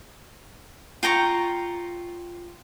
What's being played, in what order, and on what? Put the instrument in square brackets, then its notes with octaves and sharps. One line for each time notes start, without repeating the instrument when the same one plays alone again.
[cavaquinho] F4 G5 A#5 C#6